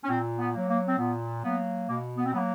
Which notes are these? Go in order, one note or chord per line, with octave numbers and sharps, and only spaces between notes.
C#4
A#2 C4
B3
F#3 A#3
A#3
C4
A#2 B3
F#3 A#3 B3
B2 A#3
B3
C4
F#3 A#3 B3